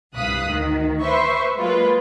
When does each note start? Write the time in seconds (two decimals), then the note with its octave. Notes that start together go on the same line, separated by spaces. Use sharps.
0.15 C2 G2 F5 D#6 F#6 B6
0.48 D2 D#3
1.02 B4 C5 E5 C#6
1.57 F#3 G#3 A#3 F4 B4